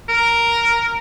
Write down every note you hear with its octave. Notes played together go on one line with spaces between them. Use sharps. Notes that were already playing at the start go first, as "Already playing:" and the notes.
A#4